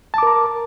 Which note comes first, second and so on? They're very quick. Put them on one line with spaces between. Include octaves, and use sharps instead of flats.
A5 D6 A#4 A#5